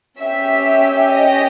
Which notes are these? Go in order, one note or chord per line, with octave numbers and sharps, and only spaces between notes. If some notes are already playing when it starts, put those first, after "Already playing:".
C#4 G4 E5
D#5